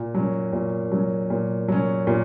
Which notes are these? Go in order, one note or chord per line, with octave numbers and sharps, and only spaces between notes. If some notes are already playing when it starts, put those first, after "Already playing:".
Already playing: A#2
F#3 C#4
A#2
F#3 C#4
A#2
F#3 C#4
A#2